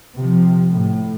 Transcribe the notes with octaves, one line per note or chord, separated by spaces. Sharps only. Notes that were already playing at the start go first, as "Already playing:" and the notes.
C3 F3
A2